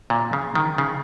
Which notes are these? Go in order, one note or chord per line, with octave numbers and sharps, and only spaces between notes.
A#2
C#3
D#3
C#3